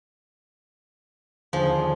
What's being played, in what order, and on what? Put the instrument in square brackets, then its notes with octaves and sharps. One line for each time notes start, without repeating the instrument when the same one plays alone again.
[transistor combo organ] D#2 D3 G#4 [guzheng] F3